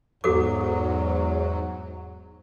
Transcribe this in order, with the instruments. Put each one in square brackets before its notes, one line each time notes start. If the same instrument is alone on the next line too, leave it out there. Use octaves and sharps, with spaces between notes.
[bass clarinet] E2 [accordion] G#2 F#3 [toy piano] F#4 A4 D6